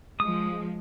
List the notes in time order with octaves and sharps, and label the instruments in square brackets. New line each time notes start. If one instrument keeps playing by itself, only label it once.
[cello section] F3 G#3 [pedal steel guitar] D#6